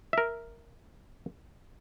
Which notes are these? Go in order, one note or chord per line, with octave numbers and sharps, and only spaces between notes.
A#4 E5